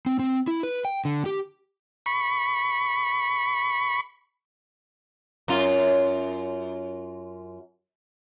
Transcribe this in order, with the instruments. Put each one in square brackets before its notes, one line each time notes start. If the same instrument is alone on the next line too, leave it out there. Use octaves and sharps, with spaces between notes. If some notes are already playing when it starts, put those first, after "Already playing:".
[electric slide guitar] C4
C4
E4
B4
G5
D3
G4
[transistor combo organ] B5 C#6
[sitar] F#2 F4